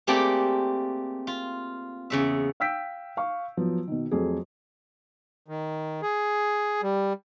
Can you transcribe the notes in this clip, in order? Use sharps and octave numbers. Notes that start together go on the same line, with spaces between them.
A3 A#3 C4 G4 G#4 D5
F4
E2 C#3 E5
F5 G5 E6 G6 B6 D7
F5 C#6
F3 F#3 B3
B2 D#3
F2 F#3 A3 G#4
D#3
G#4
G3